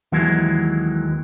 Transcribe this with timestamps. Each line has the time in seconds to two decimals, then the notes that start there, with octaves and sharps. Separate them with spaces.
0.12 D#2 E3 F#3 G#3